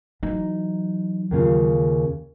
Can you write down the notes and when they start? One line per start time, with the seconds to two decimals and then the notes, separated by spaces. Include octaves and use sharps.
0.23 E3 F#3 D#4
1.31 D#2 C#3 F4